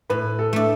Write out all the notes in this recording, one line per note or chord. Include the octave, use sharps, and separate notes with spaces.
A2 B4
A4
A3 D4